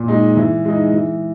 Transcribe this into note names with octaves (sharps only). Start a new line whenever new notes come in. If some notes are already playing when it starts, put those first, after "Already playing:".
Already playing: A#2
G#3 D#4
E3
G#3 D#4
E3